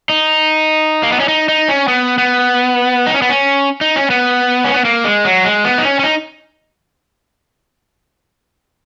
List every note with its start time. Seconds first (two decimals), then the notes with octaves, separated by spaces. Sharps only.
0.09 D#4
1.03 A#3
1.12 B3
1.20 C#4
1.28 D#4
1.49 D#4
1.68 C#4
1.88 B3
2.18 B3
3.06 D#4
3.14 C#4
3.22 B3
3.29 C#4
3.81 D#4
3.96 C#4
4.10 B3
4.64 C#4
4.74 B3
4.85 A#3
5.04 G#3
5.25 F#3
5.45 G#3
5.65 B3
5.78 D#4
5.85 C#4
5.99 C#4
6.04 D#4